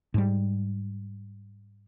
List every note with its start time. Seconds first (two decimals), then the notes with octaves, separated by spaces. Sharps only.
0.14 G#2 G3